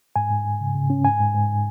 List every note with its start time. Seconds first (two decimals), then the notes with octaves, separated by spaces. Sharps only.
0.16 G#2 G#5
0.30 G#2
0.45 G#2
0.60 C#3
0.75 C#3
0.90 C#4
1.04 G#2 G#5
1.20 G#2
1.34 G#2